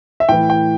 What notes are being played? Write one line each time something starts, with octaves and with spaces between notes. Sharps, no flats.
E5
A2 E3 G5
G5